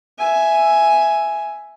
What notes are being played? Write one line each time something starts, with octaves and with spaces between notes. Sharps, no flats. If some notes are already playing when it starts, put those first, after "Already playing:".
E5 G#5